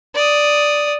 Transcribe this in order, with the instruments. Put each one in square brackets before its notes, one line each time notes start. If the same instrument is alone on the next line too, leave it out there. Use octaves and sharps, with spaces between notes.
[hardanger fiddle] D5 D#6